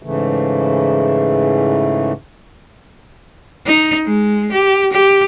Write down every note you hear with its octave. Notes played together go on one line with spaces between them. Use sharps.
G#2 C#3 E3 A3
D#4
G#3
G4
G4